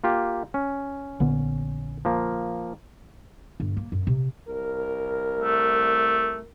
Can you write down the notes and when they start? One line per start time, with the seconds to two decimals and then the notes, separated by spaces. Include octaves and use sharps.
0.04 A#3 F4 G4
0.54 C#4
1.20 A#1 D3 B3
2.05 F3 A#3
3.60 G1
3.77 A#3
3.92 F#2
4.07 C3
4.47 C2 A#4
5.40 A3